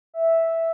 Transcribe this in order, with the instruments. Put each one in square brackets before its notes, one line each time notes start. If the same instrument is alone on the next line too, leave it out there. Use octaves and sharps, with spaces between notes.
[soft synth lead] E5